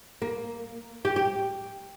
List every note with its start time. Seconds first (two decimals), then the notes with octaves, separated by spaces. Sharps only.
0.22 A#3
1.05 G4
1.16 G4